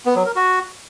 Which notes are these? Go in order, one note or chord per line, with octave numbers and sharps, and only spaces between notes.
B3
F#3
A#4
F#4